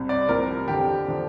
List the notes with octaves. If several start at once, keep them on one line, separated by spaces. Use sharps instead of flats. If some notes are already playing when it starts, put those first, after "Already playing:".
Already playing: C2 C3
D5
C2 C3 F3 A#4
F2 D3 F3 G4
D3 F3